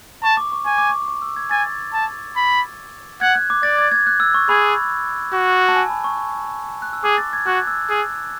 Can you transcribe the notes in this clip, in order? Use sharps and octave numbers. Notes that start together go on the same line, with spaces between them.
A5 C#6
D6
C#6
G#5 C#6
D6
C#6
C#6
E6
G#6
G#5 A6
A5
B5
F#5 G#6
F#6
D6
D5 A6
G#6
G#6
F#6
E6
C#6
G#4 B5
F#4
A5
G#5
B5
C#6
F#6
E6
G#4 D6
A6
G#6
F#4 F#6
E6
G#4